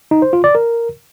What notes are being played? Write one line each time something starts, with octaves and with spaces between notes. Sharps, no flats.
D#4
C5
F4
D5
A#4